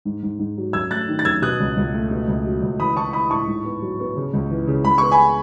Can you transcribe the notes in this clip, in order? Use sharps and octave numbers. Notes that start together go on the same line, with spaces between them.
G#2
G#2
G#2
F#3
F#2 E6 G#6
A3 F#6 A6
D#3
A6
F#2 E6 G#6
B2 D#6 F#6
C#2
C#2
A3
B2
C#2
F#3
C#2
E3 B5 D#6
E3 A5 C#6
E3 B5 D#6
A2 A5 C#6
G#2
B3
F#3
B3
C#3
C#2
E3
C#3
G#3 B5
B3 C#6
G#5 B5